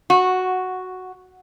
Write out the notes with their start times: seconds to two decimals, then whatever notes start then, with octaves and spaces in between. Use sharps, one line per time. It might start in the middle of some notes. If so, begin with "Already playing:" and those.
0.10 F#4